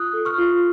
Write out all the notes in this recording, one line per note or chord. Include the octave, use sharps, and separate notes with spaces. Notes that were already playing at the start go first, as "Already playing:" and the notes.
Already playing: F4 D#6 F#6
A4
C#6 F6
F4